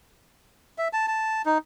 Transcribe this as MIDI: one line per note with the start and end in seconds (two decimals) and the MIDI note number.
0.78 0.88 76
0.93 1.07 81
1.08 1.42 81
1.46 1.58 63